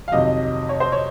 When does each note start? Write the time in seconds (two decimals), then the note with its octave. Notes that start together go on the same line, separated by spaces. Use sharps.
0.08 F5
0.12 F2 C3 D#3 F#3 D#5
0.69 C#5
0.80 C5
0.92 C#5